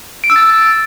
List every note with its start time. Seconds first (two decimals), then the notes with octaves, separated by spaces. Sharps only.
0.24 D7
0.30 E6
0.36 A6
0.42 E6